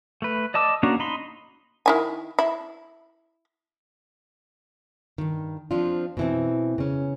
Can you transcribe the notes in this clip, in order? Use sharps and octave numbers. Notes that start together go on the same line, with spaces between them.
A3 B4
D5 D#5 A5 D6 E6
A#3 C#4 D4 F#4 A#4
D#4 B5 C6
D#3 E4 G#5
E4
G2 D#3
F3 C4 D4 F4
B2 E3 C4
C#3 C#4